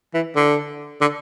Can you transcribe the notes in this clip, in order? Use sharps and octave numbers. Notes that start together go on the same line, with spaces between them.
E3
D3
D3